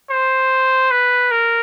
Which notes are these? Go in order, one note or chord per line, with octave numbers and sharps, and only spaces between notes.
C5
B4
A#4